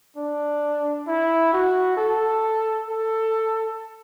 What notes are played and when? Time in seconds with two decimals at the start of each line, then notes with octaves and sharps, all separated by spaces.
0.17 D4
1.07 E4
1.53 F#4
1.97 A4
2.88 A4